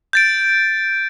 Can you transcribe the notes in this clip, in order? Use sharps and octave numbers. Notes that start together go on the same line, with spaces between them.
G6 A6 D7